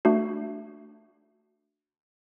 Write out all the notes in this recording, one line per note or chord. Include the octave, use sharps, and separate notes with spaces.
A3 D4 F#4